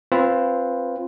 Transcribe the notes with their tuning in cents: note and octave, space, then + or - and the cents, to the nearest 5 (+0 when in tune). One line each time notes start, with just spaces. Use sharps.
C4 +15 F4 +0 B4 +0